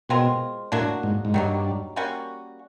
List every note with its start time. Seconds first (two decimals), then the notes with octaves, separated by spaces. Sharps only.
0.09 B2 G#3 C4 F4 A#4
0.72 A2 F#3 A#3 D4 F#4
1.03 G#2
1.25 G#2
1.34 G2 D#3 F#3 A#3
1.96 G3 A#3 C#4 F#4